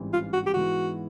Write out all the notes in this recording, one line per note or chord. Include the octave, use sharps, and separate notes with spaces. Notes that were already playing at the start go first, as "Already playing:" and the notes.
Already playing: A1 G#2 E3 G3 C4
F4
F#4
G4
G#2 E3 G#3 B3 E4 F#4